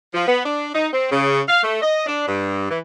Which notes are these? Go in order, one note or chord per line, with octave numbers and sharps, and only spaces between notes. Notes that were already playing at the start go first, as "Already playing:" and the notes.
F3
B3
D4
D#4
C4
C#3
F5
A3
D#5
D4
G2
E3